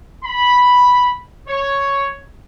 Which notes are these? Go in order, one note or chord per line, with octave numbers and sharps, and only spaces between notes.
B5
C#5